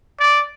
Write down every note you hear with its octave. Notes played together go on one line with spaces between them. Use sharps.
D5